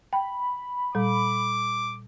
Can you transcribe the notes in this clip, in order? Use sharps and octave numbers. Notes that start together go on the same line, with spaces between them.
G5 B5
A#2 G3 D6